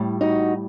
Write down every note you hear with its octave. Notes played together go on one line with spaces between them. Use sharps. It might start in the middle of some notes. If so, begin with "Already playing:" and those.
Already playing: A2 G3
D#4 F#4